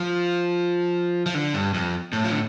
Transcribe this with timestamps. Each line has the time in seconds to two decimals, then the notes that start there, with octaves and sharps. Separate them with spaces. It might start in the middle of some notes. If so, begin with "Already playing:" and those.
Already playing: F3
1.26 F3
1.35 D3
1.54 G2
1.74 F2
2.13 A2
2.24 F3
2.31 D3